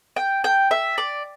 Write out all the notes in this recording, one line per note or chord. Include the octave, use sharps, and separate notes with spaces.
G5
G5
E5
D5